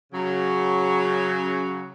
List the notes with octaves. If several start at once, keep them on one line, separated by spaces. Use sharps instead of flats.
C#3 F#3